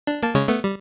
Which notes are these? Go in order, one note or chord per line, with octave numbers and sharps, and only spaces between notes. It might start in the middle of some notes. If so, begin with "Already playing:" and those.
D4
A#3 A5
C#3 G#3 C#5
A3 B3
G3